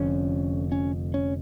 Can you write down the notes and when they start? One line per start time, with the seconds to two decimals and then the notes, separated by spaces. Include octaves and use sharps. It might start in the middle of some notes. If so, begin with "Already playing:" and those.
Already playing: F1 F2 D3 C#4
0.72 C#4
1.14 C#4